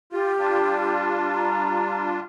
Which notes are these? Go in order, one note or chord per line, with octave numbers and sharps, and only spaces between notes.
F4 G4
G3 D4 F4
A#5